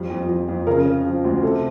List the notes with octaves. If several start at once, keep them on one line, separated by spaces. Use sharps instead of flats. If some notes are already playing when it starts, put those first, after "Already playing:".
Already playing: F2 G3
F2
F2
F2
C#3 A#4
C#3
F3
D2
C3 A4